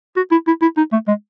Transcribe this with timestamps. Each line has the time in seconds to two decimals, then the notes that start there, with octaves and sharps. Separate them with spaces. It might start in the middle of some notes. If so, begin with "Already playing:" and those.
0.16 F#4
0.31 E4
0.47 E4
0.62 E4
0.77 D#4
0.93 A3
1.08 G#3